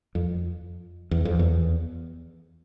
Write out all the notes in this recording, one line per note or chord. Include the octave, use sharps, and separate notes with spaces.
F2
E2
F2
E2